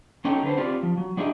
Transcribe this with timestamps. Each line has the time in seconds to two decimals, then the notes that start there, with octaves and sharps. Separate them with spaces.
0.25 F#3 C#4 D#4 A4 G5
0.43 D3 B4 C5
0.57 C4 F4 G4 D5
0.83 F3
0.97 F#3
1.17 F#3 D4 E4 G4 G#4 D#5